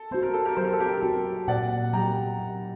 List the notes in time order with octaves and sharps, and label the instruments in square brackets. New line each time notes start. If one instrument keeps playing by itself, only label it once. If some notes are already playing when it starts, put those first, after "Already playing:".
Already playing: [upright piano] A4
[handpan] C4 F#4 [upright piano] C5
[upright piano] A#4
A4
G4 A#4
[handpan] F#3 [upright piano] C5
[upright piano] A#4
A4
G4 A#4
[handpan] C4 F#4
[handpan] A#2 [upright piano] D5 F#5
[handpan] F#3 C4 G4 [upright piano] G5 A#5
[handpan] A#2